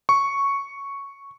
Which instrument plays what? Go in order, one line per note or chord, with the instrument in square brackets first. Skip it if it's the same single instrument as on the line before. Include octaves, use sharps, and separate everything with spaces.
[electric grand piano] C#6